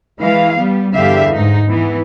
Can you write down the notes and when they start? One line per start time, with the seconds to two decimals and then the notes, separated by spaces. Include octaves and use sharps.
0.21 E3 G#3 F5
0.59 G3 B3
0.94 E2 G2 D3 G4 E5 F5
1.33 G#2 D#4
1.68 E3 B3